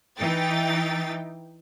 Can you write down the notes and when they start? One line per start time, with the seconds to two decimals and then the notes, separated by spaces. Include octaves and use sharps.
0.17 E3 D#4 G5 A6